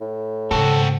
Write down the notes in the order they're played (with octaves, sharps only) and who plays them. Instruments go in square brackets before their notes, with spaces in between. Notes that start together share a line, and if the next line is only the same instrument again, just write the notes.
[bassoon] A2
[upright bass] G#2 C#3 [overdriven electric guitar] C4 F#4 [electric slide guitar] A4